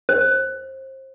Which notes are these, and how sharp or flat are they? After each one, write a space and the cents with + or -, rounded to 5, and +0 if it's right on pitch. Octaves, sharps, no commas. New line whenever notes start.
C5 +25